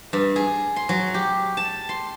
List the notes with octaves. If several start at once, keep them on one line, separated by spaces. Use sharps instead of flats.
G2
G#4
C6
F#3
G4
A5
C6